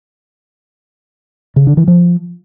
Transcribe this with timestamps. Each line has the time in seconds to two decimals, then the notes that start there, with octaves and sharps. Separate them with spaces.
1.56 C#3
1.67 D3
1.77 E3
1.88 F3